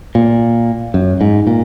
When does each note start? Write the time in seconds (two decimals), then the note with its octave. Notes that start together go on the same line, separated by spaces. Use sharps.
0.15 A#2
0.94 F#2
1.21 G#2
1.47 A#2